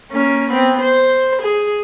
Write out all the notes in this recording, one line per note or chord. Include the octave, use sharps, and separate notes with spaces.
A#3 C#4
B3 C4
C5
G#4